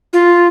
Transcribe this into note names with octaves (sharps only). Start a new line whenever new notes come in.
F4